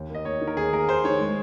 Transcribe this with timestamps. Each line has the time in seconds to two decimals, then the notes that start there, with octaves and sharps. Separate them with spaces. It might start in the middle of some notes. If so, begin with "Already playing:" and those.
Already playing: D#2
0.10 A#3 D#5
0.25 D#2 C#5
0.41 D#3
0.47 A#4
0.57 D#2 G#4
0.73 A#3 A#4
0.88 D#2 C5
1.04 D#3 C#5
1.20 G#3